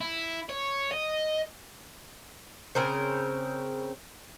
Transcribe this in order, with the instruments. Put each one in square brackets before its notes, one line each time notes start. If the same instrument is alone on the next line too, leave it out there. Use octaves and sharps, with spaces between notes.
[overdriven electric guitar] E4
C#5
D#5
[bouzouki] C#3 C4 A#4 C5